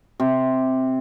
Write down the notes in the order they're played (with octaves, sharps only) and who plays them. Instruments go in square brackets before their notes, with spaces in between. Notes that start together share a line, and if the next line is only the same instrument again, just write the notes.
[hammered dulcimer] C3